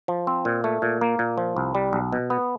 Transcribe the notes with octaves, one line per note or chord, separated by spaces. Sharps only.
F3
C4
A#2
A3
A#2
A#3
A#2
F3
C2
G3
B1
B2
B3